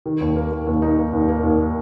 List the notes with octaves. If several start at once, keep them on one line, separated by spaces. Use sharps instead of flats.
D#3
D#2
A#3
A#3
D#2
D#4
A#3
D#2
A#3
D#2